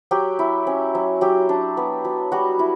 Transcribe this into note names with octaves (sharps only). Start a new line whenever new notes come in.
F#3 G4
E4
C#4
F#3
F#3 G4
D4
B3
F#3
G3 F#4
E4